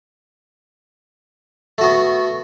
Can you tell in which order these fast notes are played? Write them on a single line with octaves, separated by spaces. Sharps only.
A3 F#4 B3